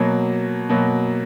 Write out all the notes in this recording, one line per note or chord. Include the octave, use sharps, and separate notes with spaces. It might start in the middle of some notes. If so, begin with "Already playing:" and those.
Already playing: B2 F#3 A#3
B2 F#3 A#3